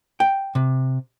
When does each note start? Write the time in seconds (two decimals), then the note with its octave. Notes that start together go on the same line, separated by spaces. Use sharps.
0.20 G5
0.55 C3